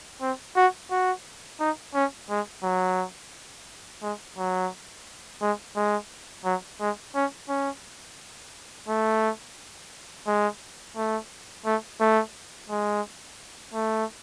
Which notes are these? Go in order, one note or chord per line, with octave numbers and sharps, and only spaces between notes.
C4
F#4
F#4
D#4
C#4
G#3
F#3
G#3
F#3
G#3
G#3
F#3
G#3
C#4
C#4
A3
G#3
A3
A3
A3
G#3
A3